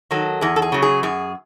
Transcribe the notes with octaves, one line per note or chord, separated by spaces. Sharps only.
D#3 F#3 A4
E2 G#4
A4
G#4
C#3 F#3
G#4
F#2 G#4